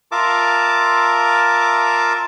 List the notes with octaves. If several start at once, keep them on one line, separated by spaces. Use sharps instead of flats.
F4 A#4 E5 F5 A5 D6